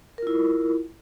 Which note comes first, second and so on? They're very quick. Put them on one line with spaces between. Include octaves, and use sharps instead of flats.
A#4 F4 E4